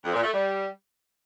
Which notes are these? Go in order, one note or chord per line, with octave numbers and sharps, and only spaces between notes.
F2
A#2
A3
G3